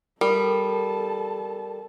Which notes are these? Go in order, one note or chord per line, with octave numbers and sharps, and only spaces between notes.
G3 A4 A#4 A5